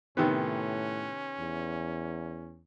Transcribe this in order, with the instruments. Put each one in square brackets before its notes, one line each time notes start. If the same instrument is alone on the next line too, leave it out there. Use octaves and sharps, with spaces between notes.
[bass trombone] A2 [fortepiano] C3 D#3 B3 [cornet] C#4
[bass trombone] E2